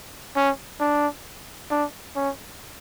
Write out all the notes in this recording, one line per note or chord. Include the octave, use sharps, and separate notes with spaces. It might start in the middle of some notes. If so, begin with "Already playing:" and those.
C#4
D4
D4
C#4